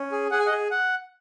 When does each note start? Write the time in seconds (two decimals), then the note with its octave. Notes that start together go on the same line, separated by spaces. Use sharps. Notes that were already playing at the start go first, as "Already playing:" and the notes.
Already playing: C#4
0.12 G#4
0.31 G#4 F#5
0.39 G#5
0.46 D#5 F#5
0.52 G#4
0.71 F#5